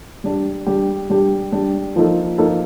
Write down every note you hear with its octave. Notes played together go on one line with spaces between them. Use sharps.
G3 D4 G4
G3 D4 G4
G3 D4 G4
G3 D4 G4
F3 A#3 D#4 A4
F3 A#3 D#4 A4